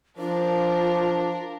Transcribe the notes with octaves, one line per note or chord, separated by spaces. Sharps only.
F3 D4 F4 A#4